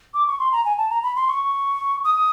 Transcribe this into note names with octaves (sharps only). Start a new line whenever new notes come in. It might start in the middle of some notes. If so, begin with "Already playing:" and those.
D6
C#6
C6
A#5
G#5
A5
A#5
B5
C6
C#6
D#6